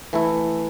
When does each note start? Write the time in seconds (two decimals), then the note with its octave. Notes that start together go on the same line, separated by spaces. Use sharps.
0.13 E3 A3 E4